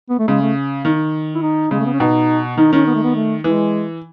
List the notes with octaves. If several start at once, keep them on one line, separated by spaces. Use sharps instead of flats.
B3
A3
C#3 G#3
A3
D#3
E4
D#4
C#3 G#3
A3
B3
C#4
B2 D#4
D#3 D#4
D#3 C#4
B3
A3
B3
A3
E3 G#3